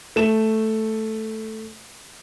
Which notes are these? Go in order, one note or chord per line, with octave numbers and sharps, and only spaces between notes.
A3 E7